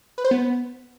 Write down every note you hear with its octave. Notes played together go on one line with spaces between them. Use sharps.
B4
C5
B3